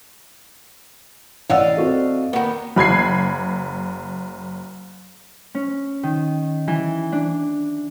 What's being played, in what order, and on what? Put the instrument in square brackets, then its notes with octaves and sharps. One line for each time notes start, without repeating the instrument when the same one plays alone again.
[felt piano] A1 F#5 E6 [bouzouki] D5 D#5 F5
[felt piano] C4 F#4 A4
[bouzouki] D#3 B3 [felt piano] A#3
[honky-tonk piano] F#1 B5 G#6 C7
[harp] C#4
D#3
E3
D4